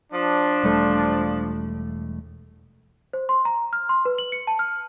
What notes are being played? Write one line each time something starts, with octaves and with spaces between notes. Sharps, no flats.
F3 D4
E1 G3 A3
C5
C6
A#5
F6
C6
B4
F#7
C#7
A5
F6